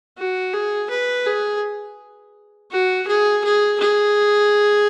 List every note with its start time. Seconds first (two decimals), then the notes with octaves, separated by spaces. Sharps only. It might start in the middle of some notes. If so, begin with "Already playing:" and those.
0.18 F#4
0.53 G#4
0.90 B4
1.26 G#4
2.71 F#4
3.08 G#4
3.44 G#4
3.80 G#4